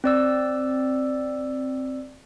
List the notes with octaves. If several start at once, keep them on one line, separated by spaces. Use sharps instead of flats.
C4 D5 E6